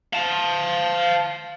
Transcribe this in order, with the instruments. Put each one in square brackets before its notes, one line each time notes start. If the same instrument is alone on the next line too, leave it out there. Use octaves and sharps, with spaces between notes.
[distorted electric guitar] F5 A5